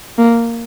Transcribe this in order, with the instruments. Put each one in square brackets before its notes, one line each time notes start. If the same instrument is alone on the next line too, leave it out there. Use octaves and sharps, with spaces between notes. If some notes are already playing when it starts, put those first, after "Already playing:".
[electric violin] A#3